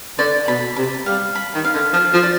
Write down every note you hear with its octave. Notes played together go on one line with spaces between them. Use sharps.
D3 D5
B2 B5
C3 B5
G3 F5
B5
D#3
F5
D3
F3 F5
F3
D5